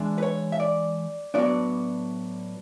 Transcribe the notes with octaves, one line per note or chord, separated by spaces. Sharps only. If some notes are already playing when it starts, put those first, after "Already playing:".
Already playing: E3 G#3 D4
B4
C#5
E5
D5
A2 F#3 B3 D4 D5